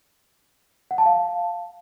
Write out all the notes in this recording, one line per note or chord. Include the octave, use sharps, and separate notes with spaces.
F#5
A5
F5